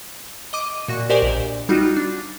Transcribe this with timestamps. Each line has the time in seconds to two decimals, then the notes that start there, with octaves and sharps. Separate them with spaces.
0.53 D#5 D6 D#7
0.88 A#2 F#4 C#6
1.10 G4 A#4 C5 D5 D#5 G#5
1.22 A#1 A#2
1.69 G3 D#4 F4 F#4
1.97 D4